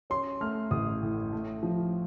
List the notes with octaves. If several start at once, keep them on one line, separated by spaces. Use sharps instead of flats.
C#4 C6
A3 F6
A1 D#6
A2
A3
F3